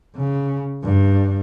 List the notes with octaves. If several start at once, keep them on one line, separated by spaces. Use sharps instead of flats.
C#3
G2